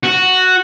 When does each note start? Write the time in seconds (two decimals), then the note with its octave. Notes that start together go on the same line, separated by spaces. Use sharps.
0.04 F#4